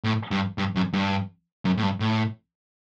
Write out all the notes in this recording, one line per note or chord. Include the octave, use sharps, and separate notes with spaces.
A2
G2
G2
F#2
G2
F#2
A2
G2
A2